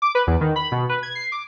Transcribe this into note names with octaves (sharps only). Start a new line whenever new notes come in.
D6
B4
E2
D#3
B5
B2
B4
G#6
C7
D6